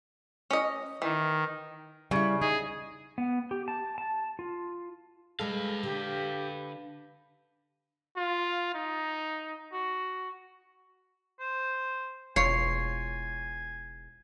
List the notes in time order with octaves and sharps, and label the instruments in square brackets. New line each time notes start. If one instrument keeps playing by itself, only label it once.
[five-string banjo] C#4 D#5
[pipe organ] D#3 [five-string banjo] E3
[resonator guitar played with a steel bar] C#3 [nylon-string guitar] G3 E4
[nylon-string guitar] D#4 [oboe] G#4
[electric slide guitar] B3
G4
A5
A5
F4
[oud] G#3 A4 [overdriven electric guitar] B4 F5
[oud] D3 [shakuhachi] G4
[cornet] F4
D#4
F#4
[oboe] C5
[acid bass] E1 [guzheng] F4 C#5 [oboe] G#5 [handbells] C7